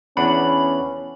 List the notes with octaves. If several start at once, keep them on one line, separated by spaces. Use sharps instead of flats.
E2 C#4 D4 F#5 B5